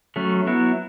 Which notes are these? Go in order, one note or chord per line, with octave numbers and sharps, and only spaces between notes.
F#3 A3 C#4
F#3 B3 E4